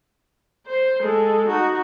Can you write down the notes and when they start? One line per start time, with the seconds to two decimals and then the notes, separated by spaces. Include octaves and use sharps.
0.67 C5
1.00 G#3 A4
1.48 D#4 F#4